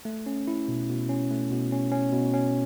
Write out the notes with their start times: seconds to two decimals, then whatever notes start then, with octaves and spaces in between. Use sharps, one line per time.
0.05 A3
0.26 C#4
0.47 E4
0.68 B2
0.89 B2
1.09 C#4
1.31 A3
1.51 B2
1.72 C#4
1.92 C#4
2.13 B2
2.33 C#4